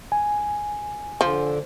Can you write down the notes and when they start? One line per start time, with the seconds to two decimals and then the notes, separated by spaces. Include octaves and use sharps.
0.12 G#5
1.21 D3 F3